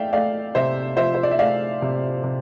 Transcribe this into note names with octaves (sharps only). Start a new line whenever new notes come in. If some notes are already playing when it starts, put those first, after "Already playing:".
Already playing: A3 D5 E5 F5 G5
A3 D5 F5
C3 C5 E5
F3 C5 E5
C5
D5
E5
A3 D5 F5
C3
C3